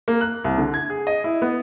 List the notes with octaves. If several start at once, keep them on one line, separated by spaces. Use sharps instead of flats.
A#3
F#6
C2
D3
G#6
G#4
D#5
E4
B3